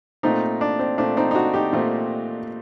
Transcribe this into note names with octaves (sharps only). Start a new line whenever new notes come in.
A#2 A3 C4 D#4
D4
C4
A#2 A3 C4 D4
C4 D#4
D#4
D4 F#4
D#4 G4
A#2 A3 C4